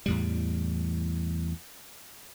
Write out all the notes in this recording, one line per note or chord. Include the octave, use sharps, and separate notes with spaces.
E2 A2 G3